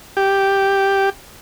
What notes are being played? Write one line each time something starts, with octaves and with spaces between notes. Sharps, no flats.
G4